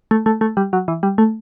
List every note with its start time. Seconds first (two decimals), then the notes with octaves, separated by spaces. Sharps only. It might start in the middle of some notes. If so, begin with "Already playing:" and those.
0.11 A3
0.26 A3
0.41 A3
0.57 G3
0.73 F#3
0.88 E3
1.03 G3
1.18 A3